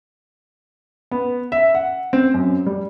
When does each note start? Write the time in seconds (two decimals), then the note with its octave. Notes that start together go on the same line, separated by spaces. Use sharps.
1.11 B3
1.52 E5
1.75 F#5
2.13 C4
2.34 F#2
2.66 G3